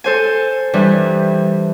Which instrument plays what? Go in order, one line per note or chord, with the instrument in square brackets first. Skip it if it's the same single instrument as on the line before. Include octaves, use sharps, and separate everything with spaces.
[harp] A4 C5 G#5
G2 E3 G3